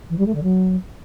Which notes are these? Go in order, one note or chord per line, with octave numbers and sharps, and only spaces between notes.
E3
G3
A3
D3
F#3